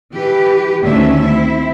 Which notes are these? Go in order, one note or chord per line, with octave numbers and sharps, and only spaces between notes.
E3 G4 B4
D2 D#3 C#4 D4 E5
C4 E4